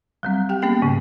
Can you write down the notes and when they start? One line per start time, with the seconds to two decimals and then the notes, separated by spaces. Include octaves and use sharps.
0.23 F#3 G3 C4
0.49 G4 G5
0.62 A#3 B3 C#4 G#4 G5
0.82 G#2 C#3